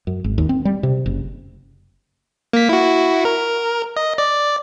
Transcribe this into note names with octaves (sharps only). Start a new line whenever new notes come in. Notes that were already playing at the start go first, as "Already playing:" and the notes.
F#2
G#1
D#2
C4
G3
C3
F#1
A#3 B6
E4 F#4
A#4
D#5
D5